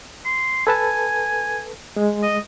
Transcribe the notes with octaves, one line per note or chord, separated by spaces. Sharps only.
C6
A4 B4 G#5 A5
G#3
D#5